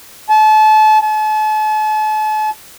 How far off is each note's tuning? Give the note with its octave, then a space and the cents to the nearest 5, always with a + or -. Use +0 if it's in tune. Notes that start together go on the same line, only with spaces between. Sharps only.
A5 -30
A5 -40